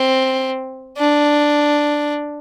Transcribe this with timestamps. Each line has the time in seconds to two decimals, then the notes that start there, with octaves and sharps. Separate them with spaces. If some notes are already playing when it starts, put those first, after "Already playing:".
Already playing: C4
0.98 D4